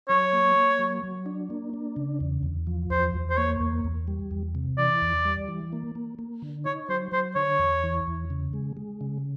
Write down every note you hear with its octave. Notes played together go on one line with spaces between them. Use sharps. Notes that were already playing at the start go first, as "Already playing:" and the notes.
F#3 C#5
A#3
A#3
F#3
F#3
D4
A#3
D4
C#3
E2
E2
F3
E2 C5
E2
C5
A#3 C#5
E2
E2
G3
E2
C3
E3 D5
E2
G3
E3
A#3
A#3
A#3
D3
D#4 C#5
F#3 C5
F#3 C5
D3 C#5
E2
E3
E2
C#3
G#3
G#3
C#3